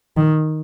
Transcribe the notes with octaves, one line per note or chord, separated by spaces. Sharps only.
D#3